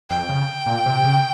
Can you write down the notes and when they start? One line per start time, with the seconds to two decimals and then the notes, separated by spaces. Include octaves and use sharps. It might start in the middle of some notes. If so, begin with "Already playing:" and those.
0.10 F2 G5
0.29 C#3
0.66 A#2
0.86 C3
1.04 C#3